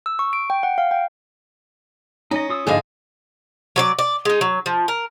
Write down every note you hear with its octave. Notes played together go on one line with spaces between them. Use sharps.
E6
C#6
D7
G5
F#5
F5
G5
C#4 D#4 D#5
F4 D#6 E6
G#2 D3 F3 E4 G#4 A4 D#5 F5
F#3 C#5 D5
D5
G#3 D#4
F#3
F3
A#4